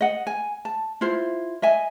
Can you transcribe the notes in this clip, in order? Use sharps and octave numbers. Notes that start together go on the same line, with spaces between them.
D#5 F#5
G#5
A5
E4 F4 C5
D#5 E5 G#5